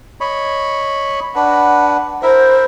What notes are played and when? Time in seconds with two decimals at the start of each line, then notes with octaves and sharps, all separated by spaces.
0.21 C#5 D#5 B5
1.35 D4 B4 F#5
2.23 E4 A#4 C5 E5